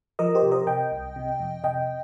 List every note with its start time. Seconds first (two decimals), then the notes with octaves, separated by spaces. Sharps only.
0.19 F3 A#4 D#5
0.35 G4 C5
0.43 C3
0.51 A#4 D#5
0.67 C3 D#5 G5
0.92 C2
1.16 C3
1.40 F2
1.64 C3 D#5 G5